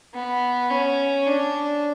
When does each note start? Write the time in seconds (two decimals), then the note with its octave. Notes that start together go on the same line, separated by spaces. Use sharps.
0.14 B3
0.71 C#4
1.26 D4